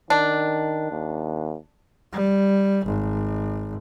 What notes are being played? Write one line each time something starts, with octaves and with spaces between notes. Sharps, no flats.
D#3 D4
D#2
G3
G#1